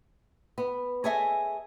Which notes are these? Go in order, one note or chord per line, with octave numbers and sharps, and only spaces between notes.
B3
G#4 A4 C#5 D#5 E5 G#5